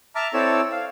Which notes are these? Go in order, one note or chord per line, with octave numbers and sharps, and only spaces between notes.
E5 A5 A#5 D6 F6
C4 E4 A4 C#5 D5 E6
F5